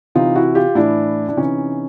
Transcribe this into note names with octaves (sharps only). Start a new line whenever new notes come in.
C3 E3 D#4 F4
E4 F#4
F4 G4
A2 E3 D4 E4
D4
C3 E3 C#4 D#4